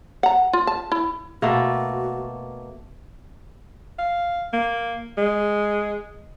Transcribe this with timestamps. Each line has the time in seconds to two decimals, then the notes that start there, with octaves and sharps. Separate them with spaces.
0.23 F#5 A#5
0.53 F4
0.67 A5
0.92 E4
1.42 B2 A3 A#3 F#4
3.99 F5
4.53 A#3
5.17 G#3